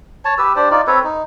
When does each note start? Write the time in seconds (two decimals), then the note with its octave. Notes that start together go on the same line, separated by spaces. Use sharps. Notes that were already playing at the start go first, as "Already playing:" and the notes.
0.25 C#5 A5
0.38 G4 B4 E6
0.56 D4 G4 C5 D5
0.70 D#4 F4 D5
0.87 C4 A4 B4 C#5
1.03 D#4